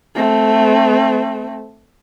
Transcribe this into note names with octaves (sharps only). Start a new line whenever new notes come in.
A3 C4